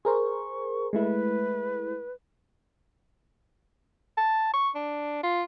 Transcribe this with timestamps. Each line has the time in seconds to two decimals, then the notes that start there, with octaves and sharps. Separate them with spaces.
0.05 G#4 A#4 C5 C#6
0.93 G#3 A3 E4 B4
4.18 A5
4.54 C#6
4.75 D4
5.23 F4